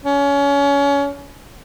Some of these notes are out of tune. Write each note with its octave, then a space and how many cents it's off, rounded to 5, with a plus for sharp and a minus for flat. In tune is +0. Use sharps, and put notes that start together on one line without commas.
C#4 +25